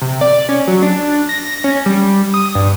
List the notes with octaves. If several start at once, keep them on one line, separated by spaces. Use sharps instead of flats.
C3
D5
C#4
F#3
D4
A#6
C#4
G3
D#6
G2